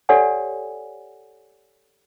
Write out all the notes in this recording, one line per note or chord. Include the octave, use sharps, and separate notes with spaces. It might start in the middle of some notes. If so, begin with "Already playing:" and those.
G4 A4 C#5 D5 F#5 G#5